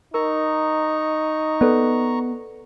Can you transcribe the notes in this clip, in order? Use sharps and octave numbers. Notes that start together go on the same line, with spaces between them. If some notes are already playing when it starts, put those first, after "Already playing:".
D#4 A#4 A#5 C#6
B3 A4 B4 D5